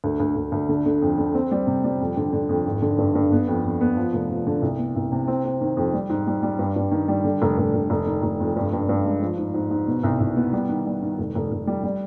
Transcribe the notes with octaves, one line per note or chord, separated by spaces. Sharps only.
D2
D2
D2
D2
D3
D3
F2
D3
C4
G3
C3
G3
F2
D3
D3
F2
G#1
D3
G2
G2
B3
F2
F2
B3
F3
F1
F3
D3
C2
B3
C2
C3
C4
C4
D#3
F2
G3
G#2
G3
G3
G2
G2
D#3
G3
D3
F1
F1
F1
F1
D#3
F1
F2
G2
G2
G2
G#3
F3
G#2
G#2
G#2
B2
C2
C2
B3
G3
D#3
G3
D#3
F1
F1
F1
G3
G3